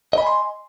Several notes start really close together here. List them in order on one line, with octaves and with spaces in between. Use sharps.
D#5 B5 G#5 C6